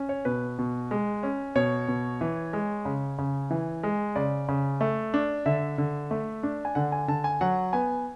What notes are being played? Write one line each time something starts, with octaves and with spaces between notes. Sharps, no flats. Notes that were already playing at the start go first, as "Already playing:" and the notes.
Already playing: C#4
C#5
B2 B4
B2
G#3
C#4
B2 C#5
B2
E3
G#3
C#3
C#3
E3
G#3
C#3 D5
C#3
A3
D4
D3 E5
D3
A3
D4
G#5
D3 F#5
G#5
D3 A5
G#5
F#3 F#5
B3 G#5